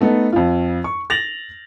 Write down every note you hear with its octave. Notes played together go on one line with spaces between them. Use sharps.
A3 B3 D#4 A4
F2 F4
C#6
A6 A#6 F7 F#7